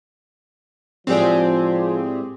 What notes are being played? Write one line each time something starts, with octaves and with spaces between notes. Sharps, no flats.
A2 F3 G#3 C4 G4 G#4 D5